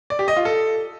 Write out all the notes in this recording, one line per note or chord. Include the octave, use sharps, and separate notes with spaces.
D5
G4
D#5
F4
A4